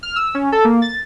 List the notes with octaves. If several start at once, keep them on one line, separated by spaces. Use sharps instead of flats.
F6
E6
C#4
A4
A#3
A6